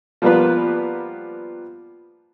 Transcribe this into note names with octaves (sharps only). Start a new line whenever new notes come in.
F3 G3 A#3 B3 F4 B4